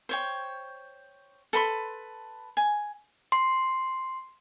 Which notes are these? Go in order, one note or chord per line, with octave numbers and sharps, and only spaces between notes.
C5 C#5 G5
A4 B4 B5 C6
G#5
C6